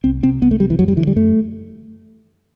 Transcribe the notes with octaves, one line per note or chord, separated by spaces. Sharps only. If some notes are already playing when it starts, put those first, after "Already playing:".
C2 C4
C3 C4
C2 B3
A3
C3 G3
E3
F#2 F#3
G3
D3 E3
G3
F#2 A3